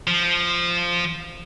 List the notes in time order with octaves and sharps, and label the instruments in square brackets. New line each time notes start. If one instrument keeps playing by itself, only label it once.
[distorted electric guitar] F3